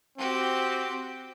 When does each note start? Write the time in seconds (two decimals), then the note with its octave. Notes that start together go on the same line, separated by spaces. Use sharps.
0.18 C4 F#4 G4